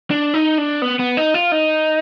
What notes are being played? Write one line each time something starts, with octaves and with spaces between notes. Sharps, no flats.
D4
D#4
D4
B3
B3
D#4
F4
D#4